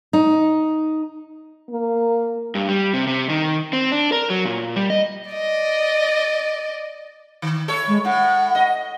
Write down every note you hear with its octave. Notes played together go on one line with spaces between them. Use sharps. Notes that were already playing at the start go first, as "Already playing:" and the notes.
D#4
A#3
G2
G3
C3
C3
D#3
C4
D4
A#4
F#3
A#2
G3
D#5
D5 D#5
D#3
A2 A4 C#5
G#3
A2 F#5
D#5